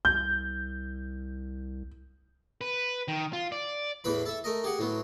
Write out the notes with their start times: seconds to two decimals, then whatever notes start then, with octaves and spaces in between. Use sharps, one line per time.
0.05 C2 G6
2.61 B4
3.08 D#3
3.33 F4
3.52 D5
4.04 E2 A2 E3 B4 B5
4.26 A4 E5
4.44 A3 A#4 D#5
4.64 G4 G#4 F#5
4.79 A2 F#3 B3